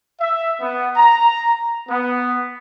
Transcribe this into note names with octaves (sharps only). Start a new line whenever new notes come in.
E5
B3
A#5
B3